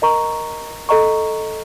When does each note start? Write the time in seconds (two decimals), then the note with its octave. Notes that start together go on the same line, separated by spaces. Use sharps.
0.02 A#4 D#5 A#5 C#6
0.89 A4 D#5 A#5 C#6